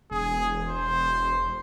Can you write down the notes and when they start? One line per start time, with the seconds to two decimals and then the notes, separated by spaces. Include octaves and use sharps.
0.11 E1 G#4
0.67 C5